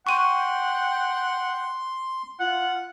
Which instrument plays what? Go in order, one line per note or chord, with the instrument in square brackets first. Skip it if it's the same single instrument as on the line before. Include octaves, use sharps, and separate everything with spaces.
[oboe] F#5 [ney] G5 [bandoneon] C6 [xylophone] C#6 D#7
[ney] F4 [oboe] F#5